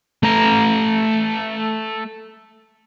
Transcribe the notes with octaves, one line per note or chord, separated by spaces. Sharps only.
A3 A#5